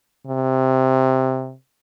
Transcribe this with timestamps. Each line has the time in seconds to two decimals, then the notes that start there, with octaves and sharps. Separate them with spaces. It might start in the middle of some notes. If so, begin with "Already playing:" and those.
0.27 C3